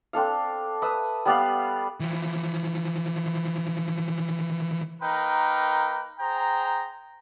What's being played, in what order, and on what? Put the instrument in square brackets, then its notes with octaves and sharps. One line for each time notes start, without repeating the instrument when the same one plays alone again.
[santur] C4 D4 A4 F5
B4 E5 D#6
G3 B3 D5 F5
[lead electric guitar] E3 F3
[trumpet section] A#3 D#4 A#4 B4 G5
G#4 C5 G5 A#5